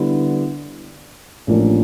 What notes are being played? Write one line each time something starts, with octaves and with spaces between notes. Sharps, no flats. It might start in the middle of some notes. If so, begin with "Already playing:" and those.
Already playing: D3 G3 B3 E4
A1 A2 F3 A#3 D4